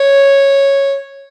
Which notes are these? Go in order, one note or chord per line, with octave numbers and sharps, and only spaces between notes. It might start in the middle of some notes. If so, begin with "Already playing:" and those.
Already playing: C#5